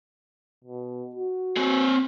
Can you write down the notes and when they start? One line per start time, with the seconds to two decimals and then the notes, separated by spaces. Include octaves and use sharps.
0.64 B2
1.15 F#4
1.57 C4 C#5